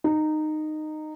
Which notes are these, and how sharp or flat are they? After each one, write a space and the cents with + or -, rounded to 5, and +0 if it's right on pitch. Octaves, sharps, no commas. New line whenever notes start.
D#4 -15